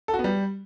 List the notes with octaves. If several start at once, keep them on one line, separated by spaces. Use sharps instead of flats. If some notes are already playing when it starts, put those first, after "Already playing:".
A4
F#4
B3
G3